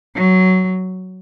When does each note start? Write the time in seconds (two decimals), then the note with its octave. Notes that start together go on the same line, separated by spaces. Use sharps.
0.15 F#3